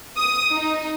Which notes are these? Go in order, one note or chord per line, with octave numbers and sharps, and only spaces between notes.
D#6
D#4